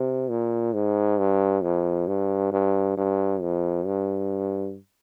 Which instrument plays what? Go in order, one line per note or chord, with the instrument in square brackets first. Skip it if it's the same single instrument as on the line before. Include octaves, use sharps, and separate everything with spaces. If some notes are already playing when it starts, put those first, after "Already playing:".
Already playing: [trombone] C3
A#2
G#2
G2
F2
G2
G2
G2
F2
G2